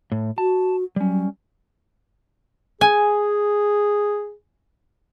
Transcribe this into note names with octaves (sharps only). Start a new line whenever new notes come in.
A2
F#4 A5
F#3 G3 C#4
G#4 G#5